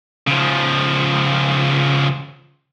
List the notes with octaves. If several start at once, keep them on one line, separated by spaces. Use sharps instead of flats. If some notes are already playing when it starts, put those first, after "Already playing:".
C#3 F3